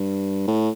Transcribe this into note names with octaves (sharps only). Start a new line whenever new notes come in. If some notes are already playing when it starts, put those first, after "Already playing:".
Already playing: G2
A2